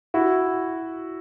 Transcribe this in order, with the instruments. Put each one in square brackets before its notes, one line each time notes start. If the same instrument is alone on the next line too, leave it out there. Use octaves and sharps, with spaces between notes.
[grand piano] E4 F#4